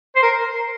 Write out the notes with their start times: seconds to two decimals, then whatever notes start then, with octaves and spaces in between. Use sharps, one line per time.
0.16 C5
0.23 A#4